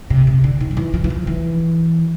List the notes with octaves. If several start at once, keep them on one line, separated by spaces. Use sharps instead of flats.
C3
C3
D3
D#3
F3
E3
F3
E3
F3
E3